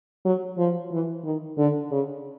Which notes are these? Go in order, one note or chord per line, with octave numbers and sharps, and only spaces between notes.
F#3
F3
E3
D#3
D3
C#3